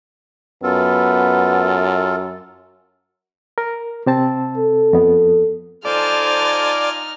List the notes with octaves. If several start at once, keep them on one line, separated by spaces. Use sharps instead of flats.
F#2 B3 F4 A4
A#4
C3 C4 A5
A4
F2 B3
D#4 F4 A4 C5 D5 G#5 A5 F6